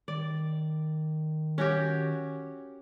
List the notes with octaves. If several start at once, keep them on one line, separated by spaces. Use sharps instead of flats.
D#3 D5
C#4 F#4 G4